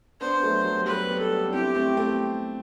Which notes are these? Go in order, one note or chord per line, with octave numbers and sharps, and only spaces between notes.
B3 D4 C5
F#3 A3
F#3
G3
F#3 B4
G3 B3
A4
G3 B3
D4
C4 E4 G4
A3 C4
A3 C4